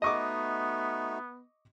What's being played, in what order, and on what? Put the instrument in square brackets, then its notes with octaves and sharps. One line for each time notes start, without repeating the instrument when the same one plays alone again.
[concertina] A3 D#4 F#4 [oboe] B3 [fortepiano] D#5 C#6 D6